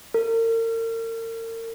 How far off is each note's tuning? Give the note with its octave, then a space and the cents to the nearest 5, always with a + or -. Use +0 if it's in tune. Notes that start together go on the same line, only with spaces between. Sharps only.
A#4 -40